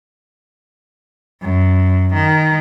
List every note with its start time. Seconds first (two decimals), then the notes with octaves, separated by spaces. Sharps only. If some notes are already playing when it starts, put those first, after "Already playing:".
1.41 F#2
2.13 D#3